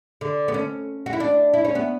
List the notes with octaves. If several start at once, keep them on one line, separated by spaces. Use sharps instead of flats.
D3
B3
C#4
F#4
E4
D4
E4
C#4
B3